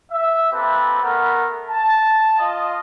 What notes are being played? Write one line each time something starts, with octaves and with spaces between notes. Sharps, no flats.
E5
A#3 C4 G4 A4 B4
A3 B3 A#4
A5
F4 D#5